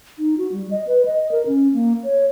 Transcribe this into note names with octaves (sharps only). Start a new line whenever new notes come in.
D#4
F#4
G3
D#5
B4
D#5
A#4
C#4
A#3
C#5